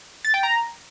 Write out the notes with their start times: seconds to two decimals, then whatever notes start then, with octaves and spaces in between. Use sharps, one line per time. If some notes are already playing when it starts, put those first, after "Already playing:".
0.25 A6
0.34 G5
0.43 A#5